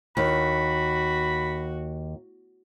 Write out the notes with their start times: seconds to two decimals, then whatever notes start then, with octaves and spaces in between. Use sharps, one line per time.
0.17 D#2 F#4 B5